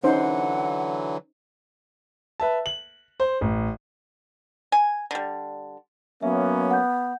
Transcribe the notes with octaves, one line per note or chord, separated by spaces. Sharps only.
D3 E3 F#3 C#4 D#4 C5 F#5
B4 E5 A5
F#7
C5
A1
G#5
D3 G3
F#3 A#3 B3 C#4 E5
F#5 G6